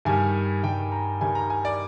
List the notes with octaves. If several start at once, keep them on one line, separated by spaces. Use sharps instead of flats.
G2 D#3 G3 G#5
G2 D#3 G3 G5
A#5
G2 D#3 G3 G#5
A#5
G#5
D5